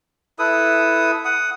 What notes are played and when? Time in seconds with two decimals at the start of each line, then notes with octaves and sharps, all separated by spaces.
0.39 E4 A4 B4 D#6
1.25 F#5 D#6